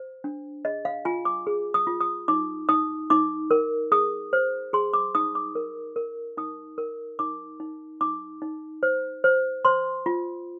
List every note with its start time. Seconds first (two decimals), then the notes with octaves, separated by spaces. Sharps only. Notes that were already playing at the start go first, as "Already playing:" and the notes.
Already playing: C5
0.24 D4
0.65 G#4 D#5
0.85 F5
1.05 F4 G#5
1.25 D6
1.47 G#4
1.74 D#6
1.87 F4
2.01 D#6
2.28 D#4 D6
2.69 D#4 D#6
3.10 D#4 D6
3.51 A#4
3.92 G#4 D#6
4.33 C5
4.73 G#4 C6
4.94 D6
5.15 D#4 D#6
5.35 D6
5.55 A#4
5.96 A#4
6.37 D#4 D#6
6.78 A#4
7.19 D#4 D6
7.60 D#4
8.01 D#4 D6
8.42 D#4
8.83 C5
9.24 C5
9.65 C5 C6
10.06 F4